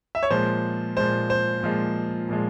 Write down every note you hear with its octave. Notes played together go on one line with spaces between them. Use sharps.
E5
C#5
A#2 F3 G#3 C5
A#2 F3 G#3 C5
C5
A#2 F3 G#3
A#2 F3 G#3